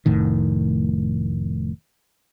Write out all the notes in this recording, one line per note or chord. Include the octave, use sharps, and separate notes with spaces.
F1 A2 D#3